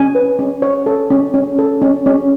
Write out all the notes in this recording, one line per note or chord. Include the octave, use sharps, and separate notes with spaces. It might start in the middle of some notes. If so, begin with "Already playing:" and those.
Already playing: C#4 G#5
B4
C#4
C#5
A4
C#4
C#4
A4
C#4
C#4